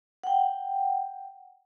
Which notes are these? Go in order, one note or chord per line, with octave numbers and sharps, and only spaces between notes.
F#5 G5